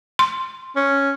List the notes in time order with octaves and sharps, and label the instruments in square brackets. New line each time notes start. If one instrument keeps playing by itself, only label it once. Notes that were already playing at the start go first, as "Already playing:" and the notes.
[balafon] C6
[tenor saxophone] C#4